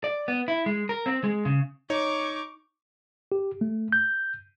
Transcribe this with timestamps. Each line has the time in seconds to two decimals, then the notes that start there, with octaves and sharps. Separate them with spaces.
0.04 D5
0.28 B3
0.48 E4
0.66 G#3
0.89 A#4
1.06 C4
1.24 G#3
1.45 C#3
1.90 D#4 C#5 C#6 D6
3.32 G4
3.61 A3
3.92 G6